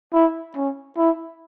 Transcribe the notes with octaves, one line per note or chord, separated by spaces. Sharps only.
E4
C#4
E4